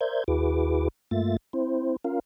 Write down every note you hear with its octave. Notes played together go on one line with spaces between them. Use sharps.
A#4 C5 D5 E5 G6 G#6
D#2 E4 F#4 G#4 B4 D6
G2 A3 A#3 F4 E5 A6
C4 E4 C5
C#4 F4 A#4 F5